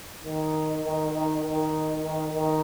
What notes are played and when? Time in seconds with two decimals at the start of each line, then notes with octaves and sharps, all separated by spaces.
0.24 D#3
0.84 D#3
1.13 D#3
1.44 D#3
2.03 D#3
2.33 D#3